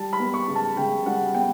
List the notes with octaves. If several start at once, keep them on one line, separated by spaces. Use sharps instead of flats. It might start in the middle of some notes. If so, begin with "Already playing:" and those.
Already playing: G3 A5
B5
B3
C#6
C#3
A5
C#3 G5
G3 F#5
B3 G5